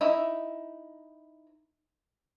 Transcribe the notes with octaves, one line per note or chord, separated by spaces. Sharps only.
D#4 E4 E5